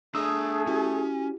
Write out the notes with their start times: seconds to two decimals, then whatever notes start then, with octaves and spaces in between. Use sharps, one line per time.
0.15 A3 D4 G#4 A#5 D#6 E6
0.67 C#4 E4 F#4 G4